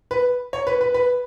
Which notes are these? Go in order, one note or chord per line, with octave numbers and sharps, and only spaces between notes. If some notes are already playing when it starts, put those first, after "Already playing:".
B4
C#5
B4
B4
B4